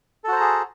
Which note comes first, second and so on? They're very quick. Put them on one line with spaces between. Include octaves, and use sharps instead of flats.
A4 F#4 C5 A#5 G#4